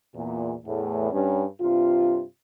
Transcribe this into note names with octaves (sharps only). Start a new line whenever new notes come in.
E2 A#2
E2 A2
G2 C#4
G2 C3 F4